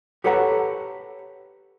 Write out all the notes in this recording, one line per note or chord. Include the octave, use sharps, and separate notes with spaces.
G4 A4 B4 C#5 F#5 A#5